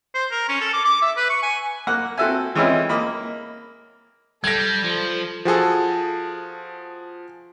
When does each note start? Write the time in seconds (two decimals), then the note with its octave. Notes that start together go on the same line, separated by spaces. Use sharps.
0.15 C5
0.31 A#4
0.49 C#4
0.61 A4
0.73 D6
0.85 D6
1.02 E5
1.17 B4
1.30 C#6
1.43 G#5
1.87 A#3 F#5 F6
2.18 C4 F#4 A4 E5 G#5
2.55 E3 G#3 C4 C#4 E4 F4
2.89 A#3 D#5 B5
4.44 G3 A4 G#6 A#6
4.84 F3
5.45 F3 F#4 G#4 A4